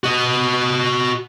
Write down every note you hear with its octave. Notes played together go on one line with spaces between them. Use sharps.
F#4 D#5